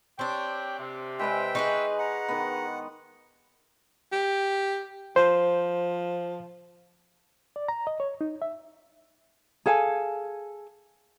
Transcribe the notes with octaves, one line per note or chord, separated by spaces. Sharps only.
C4 D4 G4 C#5 G5
C3
G#3 B4 D5 E5 G5
D#4 G#4 B4 C#6
F#5 A#5
D#3 B3
G4
F3 C5
D5
A#5
D#5
C#5
D#4
E5
G#4 A4 F5 G#5